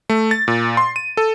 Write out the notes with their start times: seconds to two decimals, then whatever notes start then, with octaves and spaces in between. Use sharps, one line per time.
0.09 A3
0.31 A6
0.48 A#2
0.77 C6
0.96 D#7
1.17 A4